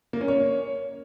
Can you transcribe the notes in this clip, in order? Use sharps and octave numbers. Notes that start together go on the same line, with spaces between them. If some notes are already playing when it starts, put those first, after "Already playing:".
A#3
C#4
C#5